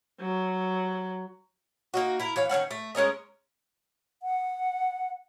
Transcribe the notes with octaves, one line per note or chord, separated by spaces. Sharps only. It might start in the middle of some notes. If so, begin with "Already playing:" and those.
F#3
A#3 D#4 F#4
E4 A#4
E3 C#5 F5
D#3 A#3 C#4 F#5
A3
G#3 C#4 A#4 D#5
F#5